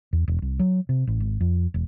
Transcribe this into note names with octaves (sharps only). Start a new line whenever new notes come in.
E2
E1
C2
F#3
C3
A1
G#1
F2
E1